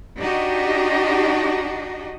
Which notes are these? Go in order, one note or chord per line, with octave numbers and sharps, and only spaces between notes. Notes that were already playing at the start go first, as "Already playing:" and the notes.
D4 D#4 F#4 G4 D#5